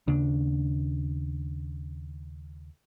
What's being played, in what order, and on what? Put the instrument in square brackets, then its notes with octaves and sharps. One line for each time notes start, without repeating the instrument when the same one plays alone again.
[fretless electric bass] D#2 C#3 D4